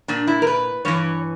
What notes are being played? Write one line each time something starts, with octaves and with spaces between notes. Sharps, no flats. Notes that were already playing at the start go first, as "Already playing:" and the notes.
A#2 D4
E4
A#4
B4
G2 E3 C#5